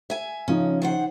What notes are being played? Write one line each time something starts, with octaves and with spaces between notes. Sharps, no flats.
E5 G#5
C#3 F3 C#4 D#4
D#3 C5 F#5